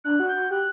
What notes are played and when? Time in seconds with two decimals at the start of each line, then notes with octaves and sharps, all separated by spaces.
0.04 D4 F#6
0.20 F#4
0.28 G6
0.36 F#4
0.51 G4 F#6